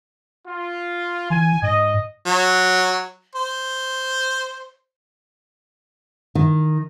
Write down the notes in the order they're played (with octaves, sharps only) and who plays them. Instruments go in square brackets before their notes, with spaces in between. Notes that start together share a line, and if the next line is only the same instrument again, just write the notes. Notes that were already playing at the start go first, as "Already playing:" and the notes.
[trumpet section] F4
[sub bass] E3 [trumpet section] G#5
[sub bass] G#2 [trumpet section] D#5
[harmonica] F#3
C5
[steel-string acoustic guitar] D#3